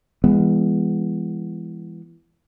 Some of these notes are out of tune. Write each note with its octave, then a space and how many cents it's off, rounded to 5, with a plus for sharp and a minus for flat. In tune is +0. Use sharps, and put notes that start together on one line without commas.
E3 +25 G#3 -25 B3 +0